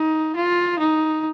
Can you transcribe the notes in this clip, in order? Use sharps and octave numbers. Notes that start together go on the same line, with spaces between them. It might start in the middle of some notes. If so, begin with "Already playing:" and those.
Already playing: D#4
F4
D#4